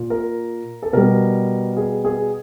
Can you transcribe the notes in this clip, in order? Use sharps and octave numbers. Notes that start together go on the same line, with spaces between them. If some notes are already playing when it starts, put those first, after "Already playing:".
Already playing: A#2
A#4
A4
B2 G3 A#4
G#4
G#4